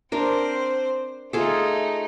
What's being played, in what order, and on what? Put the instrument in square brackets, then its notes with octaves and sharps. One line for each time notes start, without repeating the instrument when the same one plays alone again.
[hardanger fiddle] C4 C5 [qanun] D4 A#4
[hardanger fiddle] A3 D#4 [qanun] F4 G#4 A4